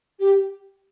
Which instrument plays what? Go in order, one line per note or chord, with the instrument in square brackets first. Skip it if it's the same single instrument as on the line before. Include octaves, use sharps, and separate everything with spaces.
[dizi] G4